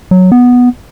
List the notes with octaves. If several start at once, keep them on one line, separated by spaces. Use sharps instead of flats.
F#3
B3